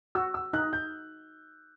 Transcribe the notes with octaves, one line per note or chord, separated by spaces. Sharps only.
F#4 E6
E6
D#4 F#6
G6